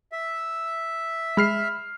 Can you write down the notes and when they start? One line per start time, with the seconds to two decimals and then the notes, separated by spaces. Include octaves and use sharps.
0.12 E5
1.37 G#3 B5 F6 C7